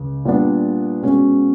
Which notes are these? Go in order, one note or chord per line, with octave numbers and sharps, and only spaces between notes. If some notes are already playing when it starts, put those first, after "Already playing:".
Already playing: C#2
A#2 G3 B3 D4
B2 G#3 C#4 F#4